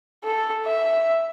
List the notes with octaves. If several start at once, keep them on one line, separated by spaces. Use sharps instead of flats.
A4
E5